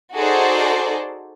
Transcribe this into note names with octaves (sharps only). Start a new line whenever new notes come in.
D#4 F#4 G#4 A4 C5 D5